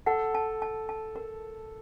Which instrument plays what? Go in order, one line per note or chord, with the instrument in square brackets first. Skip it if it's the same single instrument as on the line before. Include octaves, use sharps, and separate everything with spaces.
[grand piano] A4 [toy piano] F#5
[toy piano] A5
A5
A5
A#4